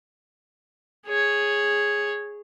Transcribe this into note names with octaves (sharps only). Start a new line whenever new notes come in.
G#4 C#5